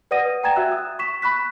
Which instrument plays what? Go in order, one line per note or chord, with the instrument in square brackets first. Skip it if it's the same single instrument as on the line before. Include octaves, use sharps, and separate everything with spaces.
[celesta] B4 D5 F#5 D#6 A#6 D#7
G5 G#5 A#5 G#6 A6 E7
F#4 E5 E6 F#6
D#6
C#6 B6 E7
B5 C#6 F#6 B6